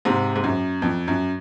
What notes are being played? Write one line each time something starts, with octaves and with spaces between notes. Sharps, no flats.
G#2 C3
G#2
F#2
F2
F#2